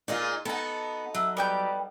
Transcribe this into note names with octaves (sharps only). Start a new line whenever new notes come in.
A#2 D#4 F4 G#4 D#5
B3 D#4 F#4 A4 A5
F#3 E5
G3 B3 G4 G6